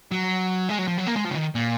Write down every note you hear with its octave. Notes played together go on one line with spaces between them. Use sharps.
F#3
G#3
F#3
F3
F#3
A#3
G#3
F3
C#3
D#3
A#2